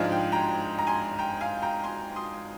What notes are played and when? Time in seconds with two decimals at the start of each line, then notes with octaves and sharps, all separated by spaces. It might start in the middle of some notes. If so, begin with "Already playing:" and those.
Already playing: G#2 F3 G#3 D4 F5 G#5
0.11 G5
0.32 G5 A#5
0.79 A#5
0.87 G#5 C6
1.19 G5 A#5
1.41 F5 G#5
1.62 G5 A#5
1.84 G#5 C6
2.16 C6 D#6